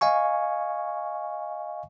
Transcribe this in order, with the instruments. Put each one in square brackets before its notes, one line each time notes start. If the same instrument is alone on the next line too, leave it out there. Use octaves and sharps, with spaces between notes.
[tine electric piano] D#5 F5 G#5 C#6